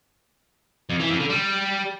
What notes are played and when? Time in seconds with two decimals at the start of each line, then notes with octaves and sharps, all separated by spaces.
0.90 F2
1.00 E3
1.10 F2
1.20 D3
1.30 G3